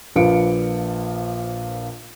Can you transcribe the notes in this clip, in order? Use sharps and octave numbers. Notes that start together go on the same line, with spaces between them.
A#1 A#2 F3 B4 C#7 D7